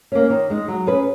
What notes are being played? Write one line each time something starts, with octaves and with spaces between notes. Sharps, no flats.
A#3 C#4
D#3
G#3 D#4
F#3
C#4 G#4 B4